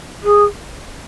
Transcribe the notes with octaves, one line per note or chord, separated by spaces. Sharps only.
G#4